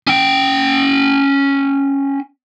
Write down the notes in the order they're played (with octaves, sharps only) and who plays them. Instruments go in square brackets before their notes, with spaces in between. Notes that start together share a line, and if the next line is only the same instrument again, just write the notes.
[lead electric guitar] C#4 G5